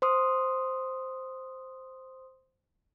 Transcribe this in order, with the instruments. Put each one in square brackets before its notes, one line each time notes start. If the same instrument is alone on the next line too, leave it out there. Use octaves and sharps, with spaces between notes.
[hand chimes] C5 C6 D#6